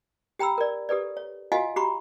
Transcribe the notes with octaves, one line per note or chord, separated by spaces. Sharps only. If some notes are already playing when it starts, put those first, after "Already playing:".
G4 G5 A#5 B5 E6
A#4 D5
G4 A4 B4 D5
C#5
F4 F#4 D#5 F5 F#5 G#5
F#4 G4 A#5 B5 C#6